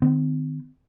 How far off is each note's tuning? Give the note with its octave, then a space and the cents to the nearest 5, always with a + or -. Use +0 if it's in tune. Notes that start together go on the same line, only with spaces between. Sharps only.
D#3 -30 C4 -40